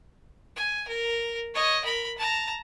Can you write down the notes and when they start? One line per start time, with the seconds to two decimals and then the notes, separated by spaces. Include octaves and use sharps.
0.56 G#5
0.88 A#4
1.54 C#5 D#5
1.84 A#4 B5
2.18 A5 A#5